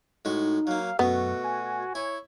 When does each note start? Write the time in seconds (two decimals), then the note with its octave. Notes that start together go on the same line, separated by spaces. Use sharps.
0.25 A2 G#3 D#4 F#4
0.67 F#3 A#3 F5
0.99 F#2 B2 A3 B3 F#4
1.44 G#5
1.95 E4 C#5